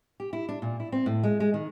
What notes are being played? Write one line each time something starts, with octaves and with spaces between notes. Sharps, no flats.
G4
E4
D4
A#2
E4
C4
A2
G#3
G#3
D#3